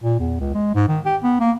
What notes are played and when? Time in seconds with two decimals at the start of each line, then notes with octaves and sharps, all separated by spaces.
0.04 A#2
0.20 E2
0.40 C#2
0.54 G#3
0.75 G#2
0.88 D#3
1.05 G4
1.24 B3
1.40 A#3